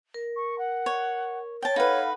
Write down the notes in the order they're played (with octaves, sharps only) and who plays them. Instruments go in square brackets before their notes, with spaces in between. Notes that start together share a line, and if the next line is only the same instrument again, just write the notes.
[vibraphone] A#4
[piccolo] C#6
F#5
[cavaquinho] C#5
[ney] C#5 [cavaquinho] G5 A5
[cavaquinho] D#4 B4 [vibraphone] A4 F#5 B5 [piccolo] F5